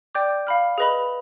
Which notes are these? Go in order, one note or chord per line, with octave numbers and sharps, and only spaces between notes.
D5 G5 D6 G6
F5 B5 F6
G#4 B4 D#5 B5